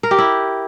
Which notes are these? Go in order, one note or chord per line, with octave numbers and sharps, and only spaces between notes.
A#4
G4
E4